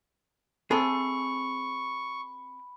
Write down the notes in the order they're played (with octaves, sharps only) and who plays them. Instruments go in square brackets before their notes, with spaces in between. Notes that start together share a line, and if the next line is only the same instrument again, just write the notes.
[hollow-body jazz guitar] C4 G#4 [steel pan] A4 [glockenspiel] B5 [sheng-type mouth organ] C#6